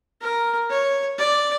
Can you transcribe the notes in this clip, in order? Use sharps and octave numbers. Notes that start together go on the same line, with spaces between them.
A#4
C#5
D5